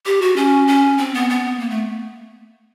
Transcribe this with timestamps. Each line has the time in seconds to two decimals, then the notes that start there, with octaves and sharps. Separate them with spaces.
0.06 G4
0.22 F#4
0.36 C#4
0.67 C#4
0.98 C4
1.14 B3
1.30 B3
1.60 A#3
1.70 A3